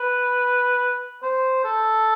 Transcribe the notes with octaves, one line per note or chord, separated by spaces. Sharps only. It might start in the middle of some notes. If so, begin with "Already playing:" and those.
Already playing: B4
C5
A4